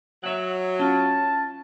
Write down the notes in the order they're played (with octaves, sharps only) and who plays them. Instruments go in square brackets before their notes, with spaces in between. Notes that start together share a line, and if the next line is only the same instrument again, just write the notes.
[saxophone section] F#3 [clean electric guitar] C#5 E5 F#5
[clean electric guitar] C#4 F4 [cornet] A5